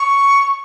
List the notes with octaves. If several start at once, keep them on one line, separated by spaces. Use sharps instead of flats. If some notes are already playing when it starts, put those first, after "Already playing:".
Already playing: C#6